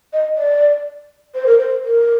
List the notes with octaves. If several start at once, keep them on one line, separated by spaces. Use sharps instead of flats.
D#5
D5
C5
A#4
C5
A#4